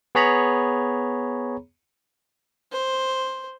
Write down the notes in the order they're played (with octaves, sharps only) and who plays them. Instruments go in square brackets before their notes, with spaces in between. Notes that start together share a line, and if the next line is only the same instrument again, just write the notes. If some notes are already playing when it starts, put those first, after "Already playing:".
[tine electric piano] B3 G#4 C#5 A#5 B5
[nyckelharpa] C5